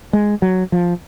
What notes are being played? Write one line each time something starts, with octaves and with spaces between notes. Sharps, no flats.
G#3
F#3
F3